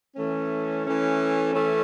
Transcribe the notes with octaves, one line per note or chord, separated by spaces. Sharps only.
E3 A3 C#4
E3 A3 C#4
E3 A3 C#4